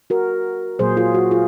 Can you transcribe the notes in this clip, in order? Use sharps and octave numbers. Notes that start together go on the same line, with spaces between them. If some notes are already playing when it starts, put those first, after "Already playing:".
F#4 A#4
A#2 F#3 A#3 G#4 C5
F4 G#4
F#4
F4 G#4